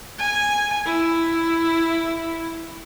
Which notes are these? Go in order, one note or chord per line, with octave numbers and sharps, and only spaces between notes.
G#5
E4